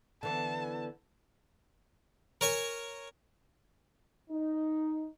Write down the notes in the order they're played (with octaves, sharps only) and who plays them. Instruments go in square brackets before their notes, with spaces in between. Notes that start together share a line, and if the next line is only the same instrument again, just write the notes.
[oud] D3 E3 B3 [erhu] A5
[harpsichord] A#4 C#5 G#5
[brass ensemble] D#4